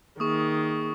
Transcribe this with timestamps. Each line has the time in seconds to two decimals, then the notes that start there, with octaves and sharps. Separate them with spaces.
0.20 D#3 A#3 G#4 C#6 D#6